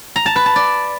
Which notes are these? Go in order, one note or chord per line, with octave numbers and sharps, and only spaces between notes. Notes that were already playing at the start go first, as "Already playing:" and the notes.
A#5
A5
B4
A5
D5